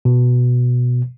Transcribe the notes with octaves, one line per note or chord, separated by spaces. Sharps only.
B2